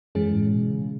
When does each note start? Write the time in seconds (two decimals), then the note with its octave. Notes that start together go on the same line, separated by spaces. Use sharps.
0.15 F#2 E3 G#3 C#4 G#4
0.33 A2
0.52 B2
0.70 C#3